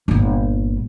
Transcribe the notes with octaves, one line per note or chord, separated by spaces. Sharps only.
G1 A#2